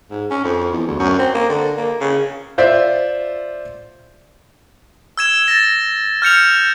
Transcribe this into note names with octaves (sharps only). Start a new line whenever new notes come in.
G#2
C#4
F2
E2
D2
F#2
C4
A#3
D3
A#3
C#3
F4 C5 D5 E5
E6 G#6 E7
A6 A#6
F6 G6 C#7 F7